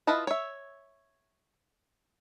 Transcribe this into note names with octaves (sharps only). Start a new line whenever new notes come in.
E4 F4 B4 D#5 A5
C#5 E5